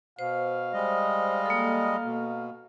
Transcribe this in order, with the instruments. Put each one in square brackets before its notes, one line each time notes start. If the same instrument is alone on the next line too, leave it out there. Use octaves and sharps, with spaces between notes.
[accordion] B2 [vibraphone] C5 [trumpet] F5
[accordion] G3 G#3 D#5
[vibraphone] A#3 A4
[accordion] B2